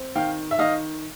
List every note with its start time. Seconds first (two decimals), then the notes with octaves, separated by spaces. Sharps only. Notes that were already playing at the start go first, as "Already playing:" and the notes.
Already playing: C4
0.15 D#3 F5 G5
0.51 E5
0.59 D#3 D#5 F5